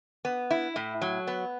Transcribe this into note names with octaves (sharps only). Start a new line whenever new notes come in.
B3
E4
A2
F#3
B3